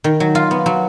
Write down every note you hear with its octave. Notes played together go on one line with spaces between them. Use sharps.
D#3
F#3
F4
B3
F#3